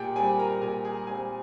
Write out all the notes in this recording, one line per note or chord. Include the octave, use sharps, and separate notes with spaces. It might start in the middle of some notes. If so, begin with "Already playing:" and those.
Already playing: A#2 G4 G#4 G5
G3 C4 G#4 G#5
A#4 A#5
A#2 G#4 G#5
G#4 G#5
G3 C4 G#4 G#5